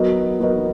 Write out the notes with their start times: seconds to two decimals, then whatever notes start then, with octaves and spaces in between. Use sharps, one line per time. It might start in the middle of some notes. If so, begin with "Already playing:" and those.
Already playing: F#3 B3 F#4 A#4 D#5
0.40 F#3 B3 F#4 A#4 D#5